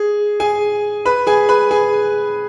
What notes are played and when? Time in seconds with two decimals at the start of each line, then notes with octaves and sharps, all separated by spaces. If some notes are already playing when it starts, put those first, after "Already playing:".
Already playing: G#4
0.40 G#4 G#5
1.05 B4 B5
1.27 G#4 G#5
1.49 B4 B5
1.71 G#4 G#5